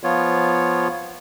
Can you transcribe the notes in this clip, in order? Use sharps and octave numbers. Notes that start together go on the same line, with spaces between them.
F3 B3 F4 C#5